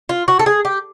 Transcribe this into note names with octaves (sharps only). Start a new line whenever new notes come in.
F4
F#4
A4
G#4
G4